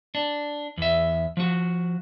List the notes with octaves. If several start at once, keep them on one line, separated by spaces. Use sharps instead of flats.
D4
E2 E5
F3 F#4